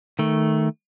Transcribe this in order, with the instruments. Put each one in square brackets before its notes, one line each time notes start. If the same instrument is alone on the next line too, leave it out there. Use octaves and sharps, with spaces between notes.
[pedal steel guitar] D#3 A3